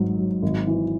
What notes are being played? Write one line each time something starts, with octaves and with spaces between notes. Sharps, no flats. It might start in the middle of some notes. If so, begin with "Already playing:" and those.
Already playing: G#1 G#2 F#3
F#3
G#1
E3